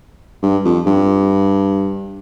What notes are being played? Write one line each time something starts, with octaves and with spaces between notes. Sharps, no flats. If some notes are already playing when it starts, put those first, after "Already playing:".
G2
F2
G2